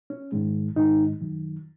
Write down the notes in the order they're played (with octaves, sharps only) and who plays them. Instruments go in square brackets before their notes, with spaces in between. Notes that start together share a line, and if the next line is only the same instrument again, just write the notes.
[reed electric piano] C#4
G#2 D#3 G#3
G#2 D#3 G#3 D#4
F#2 D#3 F#3